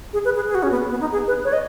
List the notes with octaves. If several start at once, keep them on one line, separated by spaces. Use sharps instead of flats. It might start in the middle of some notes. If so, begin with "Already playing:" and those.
G#4
B4
G#4
G#4
F#4
C#4
B3
B3
D#4
G#4
B4
C#5
D#5